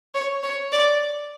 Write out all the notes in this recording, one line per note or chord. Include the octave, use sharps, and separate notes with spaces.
C#5
C#5
D5